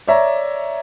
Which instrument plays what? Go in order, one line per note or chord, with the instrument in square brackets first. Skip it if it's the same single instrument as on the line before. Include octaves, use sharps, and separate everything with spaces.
[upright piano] C#5 D5 E5 A#5